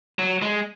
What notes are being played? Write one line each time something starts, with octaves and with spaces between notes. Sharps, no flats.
F#3
G#3